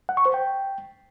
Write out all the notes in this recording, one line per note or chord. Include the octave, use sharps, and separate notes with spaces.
F#5
C#6
C5
G5